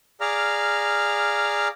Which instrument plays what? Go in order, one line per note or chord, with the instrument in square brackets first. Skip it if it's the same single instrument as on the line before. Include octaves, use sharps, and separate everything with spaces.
[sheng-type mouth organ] G#4 D5 F5 A#5 F6